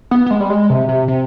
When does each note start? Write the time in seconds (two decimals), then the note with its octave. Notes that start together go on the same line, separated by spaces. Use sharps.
0.11 B3
0.26 B3
0.31 G#3
0.40 G3
0.50 G#3
0.70 C3
0.89 C3
1.08 C3